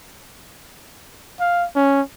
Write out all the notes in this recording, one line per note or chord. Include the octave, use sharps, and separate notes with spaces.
F5
C#4